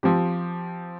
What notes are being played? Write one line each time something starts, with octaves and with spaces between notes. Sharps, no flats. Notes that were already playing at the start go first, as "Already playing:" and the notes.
F3 C4 G4